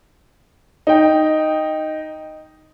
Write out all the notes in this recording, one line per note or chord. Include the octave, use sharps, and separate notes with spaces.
D#4 G5